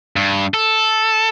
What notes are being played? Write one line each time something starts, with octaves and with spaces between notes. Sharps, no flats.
G2
A4